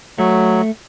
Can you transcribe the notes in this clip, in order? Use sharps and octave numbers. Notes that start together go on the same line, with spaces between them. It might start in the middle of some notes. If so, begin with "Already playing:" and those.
F#3 A3